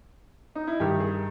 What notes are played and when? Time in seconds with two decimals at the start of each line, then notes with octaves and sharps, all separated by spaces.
0.55 D#4
0.67 E4
0.80 G2 D#3 G4
1.00 G#4